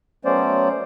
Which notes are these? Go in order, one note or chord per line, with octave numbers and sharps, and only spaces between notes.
F#3 A3 B3 C#4 C5 D5